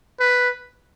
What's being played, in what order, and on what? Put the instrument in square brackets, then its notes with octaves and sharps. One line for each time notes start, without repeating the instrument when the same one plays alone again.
[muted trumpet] B4